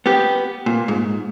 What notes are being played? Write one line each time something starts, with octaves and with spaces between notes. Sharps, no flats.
B3 G4
A#2
G#2